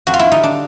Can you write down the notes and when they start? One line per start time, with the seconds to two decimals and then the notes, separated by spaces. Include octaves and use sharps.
0.07 F2 F#4
0.14 F4
0.19 E4
0.31 D3 G3 D#4
0.43 D4